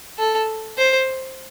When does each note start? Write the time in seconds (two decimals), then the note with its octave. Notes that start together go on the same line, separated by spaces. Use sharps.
0.19 A4
0.78 C5